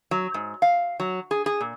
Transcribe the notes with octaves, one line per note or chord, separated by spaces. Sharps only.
F#3
G#2
F5
F#3
G#4
G#4
A#2